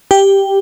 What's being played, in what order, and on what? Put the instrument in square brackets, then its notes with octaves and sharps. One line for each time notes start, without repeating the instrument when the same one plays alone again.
[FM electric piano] G4